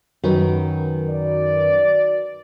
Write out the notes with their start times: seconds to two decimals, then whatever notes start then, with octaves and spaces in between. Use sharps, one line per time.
0.24 F#2 D#3 F#4 A#4 B4
1.10 D5